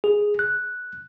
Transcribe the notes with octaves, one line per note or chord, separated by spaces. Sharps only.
G#4
F#6